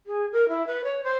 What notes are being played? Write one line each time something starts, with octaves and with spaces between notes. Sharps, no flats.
G#4
A#4
E4
B4
C#5
C5